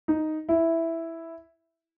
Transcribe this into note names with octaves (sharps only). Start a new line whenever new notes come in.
D#4
E4